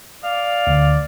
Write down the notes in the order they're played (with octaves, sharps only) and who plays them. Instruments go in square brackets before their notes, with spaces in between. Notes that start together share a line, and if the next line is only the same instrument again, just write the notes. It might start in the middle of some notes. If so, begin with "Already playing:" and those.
[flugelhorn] D5 [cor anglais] F5
[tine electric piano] D2 D3